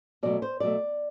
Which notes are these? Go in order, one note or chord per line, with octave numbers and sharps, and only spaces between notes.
B2 F#3 A3 D5
C5
B2 F#3 A3 D5